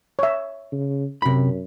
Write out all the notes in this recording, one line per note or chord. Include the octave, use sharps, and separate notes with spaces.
C#5 E5
C#3
F#2 C3 B5